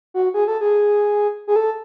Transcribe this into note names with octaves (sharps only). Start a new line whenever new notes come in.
F#4
G#4
A4
G#4
G#4
A4